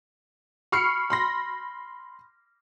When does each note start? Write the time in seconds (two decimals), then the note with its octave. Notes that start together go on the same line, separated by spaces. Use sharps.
0.72 B5 C#6 F6 C7 C#7
1.10 B5 C6 A#6